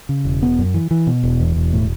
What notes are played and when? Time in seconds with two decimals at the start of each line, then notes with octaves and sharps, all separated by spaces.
0.09 C#3
0.25 E1
0.42 B3
0.59 F#2
0.74 E3
0.91 E3
1.07 B2
1.23 E1
1.40 E2
1.56 E1
1.73 A2